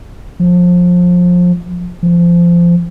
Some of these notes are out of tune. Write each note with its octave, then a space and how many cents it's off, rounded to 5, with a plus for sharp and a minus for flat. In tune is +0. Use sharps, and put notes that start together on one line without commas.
F3 +25
F3 -20